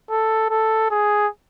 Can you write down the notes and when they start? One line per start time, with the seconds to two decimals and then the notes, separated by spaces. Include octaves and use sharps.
0.10 A4
0.50 A4
0.91 G#4